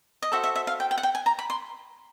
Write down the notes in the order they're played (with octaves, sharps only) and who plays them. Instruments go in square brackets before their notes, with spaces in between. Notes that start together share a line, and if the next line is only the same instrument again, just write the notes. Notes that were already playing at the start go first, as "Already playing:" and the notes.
[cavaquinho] D#5
F#4 A4 C5 E5
E5
E5
F5
G5
G5
F#5
G5
G#5
A#5
B5
C6